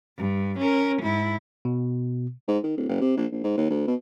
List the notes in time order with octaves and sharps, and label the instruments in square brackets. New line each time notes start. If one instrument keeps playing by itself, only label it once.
[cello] G2
C#4 A#4
G#2 E4
[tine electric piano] B2
[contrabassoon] G#2
D#3
D1
F#1
C3
A#1
A#1
G#2
D#2
D2
B2